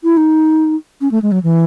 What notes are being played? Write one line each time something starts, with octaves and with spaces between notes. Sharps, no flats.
E4
D#4
C#4
A3
G#3
F#3
E3